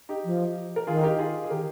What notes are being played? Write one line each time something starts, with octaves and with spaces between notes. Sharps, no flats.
D#4 G4
F3
A#4
D#3 F4 G#4
D#4 G4
F4 G#4
G#4
D#3 G4 A#4